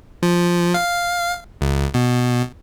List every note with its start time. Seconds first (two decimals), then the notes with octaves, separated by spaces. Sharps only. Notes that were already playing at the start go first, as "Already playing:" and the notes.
0.23 F3
0.74 F5
1.61 C#2
1.94 B2